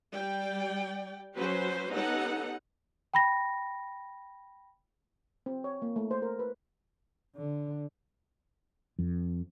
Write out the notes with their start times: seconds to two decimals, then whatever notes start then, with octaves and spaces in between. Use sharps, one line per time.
0.13 G3 D5 G5
1.35 F#3 C#4 F#4 B4 C5
1.91 B3 C#4 D#4 G4 A4 F#5
3.14 G5 B5 A#6
5.46 C4
5.64 C#5
5.82 A#3
5.96 A3
6.11 C5
6.22 A#4
6.39 B4
7.36 D3
8.99 F2